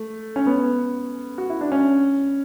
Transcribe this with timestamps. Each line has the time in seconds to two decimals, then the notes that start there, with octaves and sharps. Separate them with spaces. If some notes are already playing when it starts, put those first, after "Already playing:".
Already playing: A3
0.36 C#4
0.46 B3
1.38 F#4
1.50 E4
1.61 D4
1.72 C#4